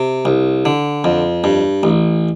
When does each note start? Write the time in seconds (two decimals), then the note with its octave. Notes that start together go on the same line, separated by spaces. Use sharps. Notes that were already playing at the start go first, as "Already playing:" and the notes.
Already playing: C3
0.25 C2
0.65 D3
1.04 F2
1.44 G2
1.83 A1